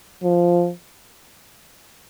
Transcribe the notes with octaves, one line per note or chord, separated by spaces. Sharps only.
F3